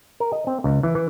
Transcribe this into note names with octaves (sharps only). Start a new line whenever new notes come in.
A#4
D#5
C4
C#2
E3
E3